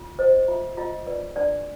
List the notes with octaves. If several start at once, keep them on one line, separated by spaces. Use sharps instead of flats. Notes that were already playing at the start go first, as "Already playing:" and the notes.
Already playing: F4
C5 D#5
F4 E5
F4 D#5
B4 D5
D4 D5